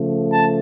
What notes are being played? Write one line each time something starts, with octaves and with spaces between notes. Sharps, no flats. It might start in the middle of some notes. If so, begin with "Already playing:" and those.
Already playing: C#3 F3 A3
A5